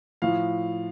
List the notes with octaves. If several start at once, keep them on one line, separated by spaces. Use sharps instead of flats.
A2 F3 F5